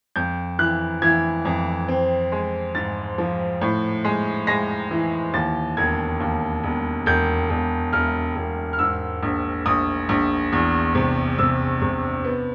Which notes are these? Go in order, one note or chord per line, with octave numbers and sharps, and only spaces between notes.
F2 G6
E3 F#6
E3 G#6
F2
C4
G#3
G#2 A6
F3
A2
G#3
G#3 A#6
E3
D#2 A6
E1 G#6
D#2
E1
E1 G6
E1
E1 F6
E1
F6
G#2 E6
A#1
A#1 D#6
A#1
E2
C3
C3 E6
C3
B3